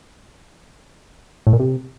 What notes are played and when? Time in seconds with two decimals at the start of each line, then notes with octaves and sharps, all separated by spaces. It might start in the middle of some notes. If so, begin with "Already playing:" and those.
1.47 A2
1.53 A#2
1.59 C3